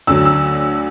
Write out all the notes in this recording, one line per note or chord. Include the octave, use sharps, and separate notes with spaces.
D2 D3 F#3 E6
E6